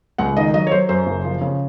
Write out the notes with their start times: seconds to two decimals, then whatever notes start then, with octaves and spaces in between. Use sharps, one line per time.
0.18 C#2 F#5
0.37 D#3 D#5
0.54 F#3 D#5
0.67 C#5
0.71 F#3 C5
0.89 F#2 C5
1.07 F#1
1.24 F3
1.41 C#3